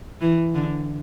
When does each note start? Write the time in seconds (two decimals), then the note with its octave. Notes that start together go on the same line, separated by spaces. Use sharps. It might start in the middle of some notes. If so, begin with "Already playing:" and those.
0.21 E3
0.55 D3